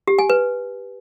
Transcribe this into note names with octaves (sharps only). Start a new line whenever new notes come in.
G4
G#5
B4